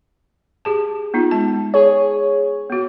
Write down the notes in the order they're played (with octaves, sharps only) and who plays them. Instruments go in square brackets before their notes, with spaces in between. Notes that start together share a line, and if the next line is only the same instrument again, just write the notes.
[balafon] G4 G#4 A5
B3 D#4 F4
G#3 A5
[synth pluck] G#4 C#5
[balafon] B3 F#4